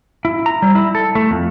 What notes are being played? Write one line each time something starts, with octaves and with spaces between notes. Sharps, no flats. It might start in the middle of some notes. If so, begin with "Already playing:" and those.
E4
A#5
G3
E4
A4
A3
F2